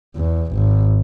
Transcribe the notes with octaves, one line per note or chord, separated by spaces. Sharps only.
E2
G#1